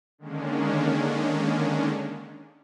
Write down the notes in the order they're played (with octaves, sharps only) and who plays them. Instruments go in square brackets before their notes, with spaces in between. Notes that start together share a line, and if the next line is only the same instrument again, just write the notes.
[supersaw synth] D3 D#3 G#3 A#3 C#4 D4